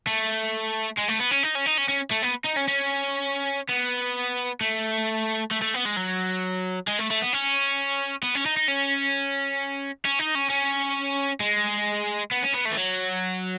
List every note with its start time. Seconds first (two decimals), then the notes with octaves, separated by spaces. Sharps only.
0.07 A3
0.98 G#3
1.09 A3
1.20 B3
1.31 C#4
1.43 D#4
1.55 C#4
1.66 D#4
1.78 C#4
1.89 C#4
2.12 A3
2.23 B3
2.45 D#4
2.57 C#4
2.68 C#4
3.69 B3
4.61 A3
5.52 A3
5.62 A3
5.74 B3
5.85 G#3
5.97 F#3
6.87 G#3
6.99 A3
7.11 A3
7.22 B3
7.33 C#4
8.23 B3
8.35 C#4
8.46 D#4
8.57 D#4
8.68 C#4
10.05 C#4
10.19 D#4
10.35 C#4
10.50 C#4
11.40 G#3
12.31 B3
12.43 C#4
12.54 B3
12.65 A3
12.72 E3
12.77 F#3